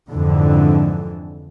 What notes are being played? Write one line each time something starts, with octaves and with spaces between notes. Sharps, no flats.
F2 G#2 D3 E3